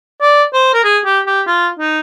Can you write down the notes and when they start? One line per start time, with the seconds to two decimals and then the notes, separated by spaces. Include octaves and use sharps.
0.22 D5
0.53 C5
0.74 A#4
0.84 G#4
1.05 G4
1.27 G4
1.47 F4
1.79 D#4